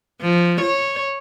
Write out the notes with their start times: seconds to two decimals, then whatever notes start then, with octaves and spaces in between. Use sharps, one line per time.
0.22 F3
0.61 C#5